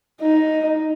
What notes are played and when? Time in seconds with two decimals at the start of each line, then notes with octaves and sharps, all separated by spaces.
0.21 D#4